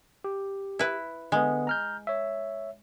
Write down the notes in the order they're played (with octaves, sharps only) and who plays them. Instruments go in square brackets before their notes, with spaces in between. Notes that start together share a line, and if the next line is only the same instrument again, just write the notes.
[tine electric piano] G4
[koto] E4 B4
[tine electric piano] D3 B3 [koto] G#3
[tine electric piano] A#5 F6 G6
C#5 E5